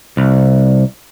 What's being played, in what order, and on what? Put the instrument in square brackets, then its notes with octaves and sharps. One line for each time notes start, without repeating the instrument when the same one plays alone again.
[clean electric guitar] C2